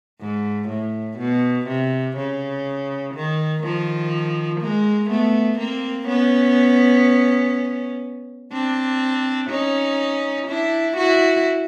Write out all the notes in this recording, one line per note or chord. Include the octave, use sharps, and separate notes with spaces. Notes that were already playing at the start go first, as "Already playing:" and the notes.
G#2
A2
B2
C3
C#3
D#3
D#3 F3
G#3 A#3
A3 B3
A#3 C4
B3 C#4
C4 D4
C#4 D#4
D4 E4
E4 F#4